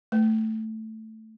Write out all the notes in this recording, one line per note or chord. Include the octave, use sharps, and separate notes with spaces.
A3